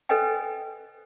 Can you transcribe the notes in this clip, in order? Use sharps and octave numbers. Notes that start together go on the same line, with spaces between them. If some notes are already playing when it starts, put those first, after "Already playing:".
A4 B4 C5 D#5 G5 G#5